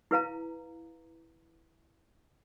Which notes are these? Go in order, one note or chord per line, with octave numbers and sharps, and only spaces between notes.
E4 B4 F5 A#5